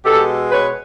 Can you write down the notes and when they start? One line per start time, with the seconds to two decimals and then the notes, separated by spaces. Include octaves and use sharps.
0.06 B2 G#3 G4 A4
0.51 B4 C#5